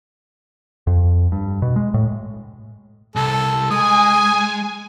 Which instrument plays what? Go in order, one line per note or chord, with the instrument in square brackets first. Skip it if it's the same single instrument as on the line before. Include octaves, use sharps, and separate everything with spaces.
[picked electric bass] F2
G2
B2
G#3
A2
[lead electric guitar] C2 [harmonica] A4
[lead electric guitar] G#3 [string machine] G#5 [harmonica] D#6